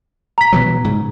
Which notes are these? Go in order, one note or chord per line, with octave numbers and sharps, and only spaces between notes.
A#5 B6
B2 E3 F#3
G#2 C#3